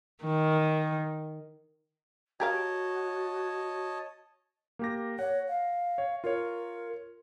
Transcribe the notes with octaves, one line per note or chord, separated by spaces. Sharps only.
D#3
F#4 G4 A#4 C#5 D#5 F5 A5 G#6
A#3 G4 A#6
C#5 F#5
F5
C#5
F4 A#4 C#5